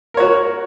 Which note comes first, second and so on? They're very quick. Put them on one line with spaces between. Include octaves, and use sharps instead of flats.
A#4 C#5 F#4